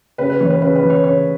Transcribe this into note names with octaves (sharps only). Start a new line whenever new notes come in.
C#3 B4
B4
E3 C#5
B4
C#3 B4
B4
E3
C#5
C#3 C#5